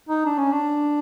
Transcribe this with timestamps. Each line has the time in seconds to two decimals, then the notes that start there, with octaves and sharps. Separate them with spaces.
0.09 D#4
0.26 D4
0.38 C#4
0.52 D4